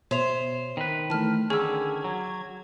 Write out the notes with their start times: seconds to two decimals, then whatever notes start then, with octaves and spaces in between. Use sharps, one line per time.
0.11 B2 C5 C#5 E5 F7
0.77 D#3 B4
1.10 E3 A3 A5 F6
1.50 D3 D#3 C#4 G#4 E6 G#6
2.04 F#3